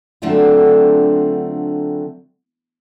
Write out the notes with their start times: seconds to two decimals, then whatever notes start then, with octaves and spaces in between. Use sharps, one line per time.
0.22 D3 F#3 A3 C4 D4 F4